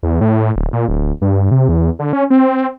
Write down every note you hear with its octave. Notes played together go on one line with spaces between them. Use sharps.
E2
A2
D1
A#2
D1
G2
C3
E2
D3
C#4
C4